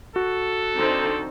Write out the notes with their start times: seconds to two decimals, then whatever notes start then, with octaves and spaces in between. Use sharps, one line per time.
0.16 F#4 A4
0.76 D3 C4 D#4